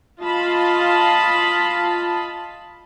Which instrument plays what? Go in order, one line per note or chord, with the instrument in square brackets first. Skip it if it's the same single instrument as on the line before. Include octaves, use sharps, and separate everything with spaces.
[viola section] F4 D#5 F5 A5 B5